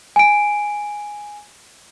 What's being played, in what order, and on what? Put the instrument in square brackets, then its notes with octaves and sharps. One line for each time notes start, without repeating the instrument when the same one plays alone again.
[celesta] G#5 D7